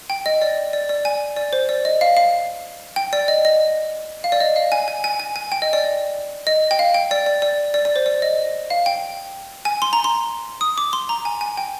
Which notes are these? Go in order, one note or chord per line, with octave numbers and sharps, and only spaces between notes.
G5
D#5
D5
D5
D5
G#5
D5
C5
D5
D#5
F5
F5
G5
D5
D#5
D#5
F5
D5
D#5
F5
G#5
G#5
G#5
G#5
G#5
G5
D#5
D5
D#5
G5
F5
G5
D5
D5
D5
D5
D5
C5
D5
D#5
F5
G5
G#5
C6
A#5
C6
D#6
D6
C6
A#5
G#5
G#5
G5